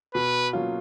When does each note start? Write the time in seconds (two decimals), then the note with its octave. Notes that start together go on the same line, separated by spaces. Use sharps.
0.14 B2 B4
0.53 F#3 A#3 C#4 F4